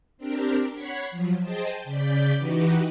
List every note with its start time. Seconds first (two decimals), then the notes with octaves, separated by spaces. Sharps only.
0.17 C4 D4 G4 A#4
0.74 C#5 F#5 B5 G#6 B6 C7
1.11 F3 F#3
1.40 G#4 C5 D#5 G5 A5
1.84 C#3 D5 G6 B6
2.36 E3 D#4 F#4 G4 B4